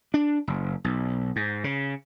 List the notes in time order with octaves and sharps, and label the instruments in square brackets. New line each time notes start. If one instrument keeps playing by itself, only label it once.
[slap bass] D4
F#1
B1
G#2
C#3